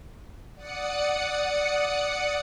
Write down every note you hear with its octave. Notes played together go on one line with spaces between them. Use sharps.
D5 F#5 D#6 C#7